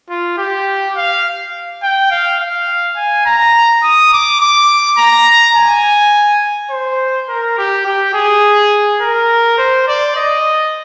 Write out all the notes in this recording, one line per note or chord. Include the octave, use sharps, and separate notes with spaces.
F4
G4
F5
G5
F5
F5
G#5
A#5
D#6
D6
D6
A#5
G#5
C5
A#4
G4
G4
G#4
A#4
C5
D5
D#5